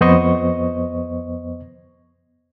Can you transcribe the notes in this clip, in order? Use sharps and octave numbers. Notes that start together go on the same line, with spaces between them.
F2 B3 C5 D#5 C#6